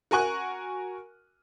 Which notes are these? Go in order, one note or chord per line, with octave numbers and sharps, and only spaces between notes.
F#4 A#4 G#5 C#6 F#6